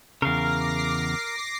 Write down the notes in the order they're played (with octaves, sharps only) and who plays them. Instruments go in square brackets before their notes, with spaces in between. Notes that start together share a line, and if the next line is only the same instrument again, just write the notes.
[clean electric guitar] E2 C#3 [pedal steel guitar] A#4 F5 [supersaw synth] D6 A#6 C7